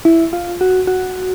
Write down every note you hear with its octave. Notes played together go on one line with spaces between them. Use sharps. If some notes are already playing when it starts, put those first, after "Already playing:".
E4
F4
F#4
F#4